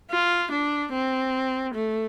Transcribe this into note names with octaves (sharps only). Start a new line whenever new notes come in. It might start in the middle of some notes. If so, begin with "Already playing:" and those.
F4
D4
C4
A3